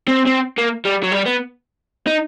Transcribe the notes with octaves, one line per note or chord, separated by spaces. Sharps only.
C4
C4
A#3
G3
F#3
G3
B3
D#4